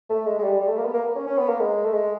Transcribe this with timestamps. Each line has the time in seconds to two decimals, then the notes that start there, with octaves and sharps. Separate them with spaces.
0.10 A3
0.27 G#3
0.39 G#3
0.43 G3
0.60 G3
0.68 A3
0.77 A#3
0.85 B3
0.93 A#3
1.16 C#4
1.27 C#4
1.38 B3
1.49 A#3
1.60 G#3
1.85 A3
1.94 G#3